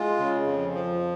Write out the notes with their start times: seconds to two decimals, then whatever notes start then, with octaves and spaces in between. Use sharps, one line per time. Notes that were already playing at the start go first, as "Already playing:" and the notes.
Already playing: G#3 F4
0.19 C#3
0.47 F2
0.74 F3